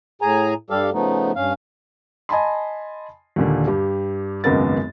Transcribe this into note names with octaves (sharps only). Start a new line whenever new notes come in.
A2 G#4 G#5 A#5
G2 G3 G4 A4 F5
C#3 F3 A3 B3 D#4
G2 C#4 F5
D#5 G#5 A5 B5 C6
D#2 A#2 D3
G2 G4
G#1 C#2 F#2 B3 A#4 A6